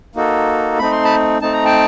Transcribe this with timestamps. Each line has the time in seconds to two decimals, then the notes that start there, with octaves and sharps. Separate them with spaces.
0.15 A#3 D#4 F#4 A4
0.79 A3 C4 D#4 B5
0.92 C6
1.04 A5 B5
1.42 A3 C4 D#4 A5
1.53 A#5
1.65 G5 A5